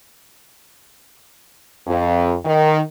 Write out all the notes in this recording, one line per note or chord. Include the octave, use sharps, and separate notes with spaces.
F2
D#3